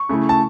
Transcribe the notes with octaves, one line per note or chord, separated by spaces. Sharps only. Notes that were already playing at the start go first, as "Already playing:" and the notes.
Already playing: C#6
C#3 A3 E4
A5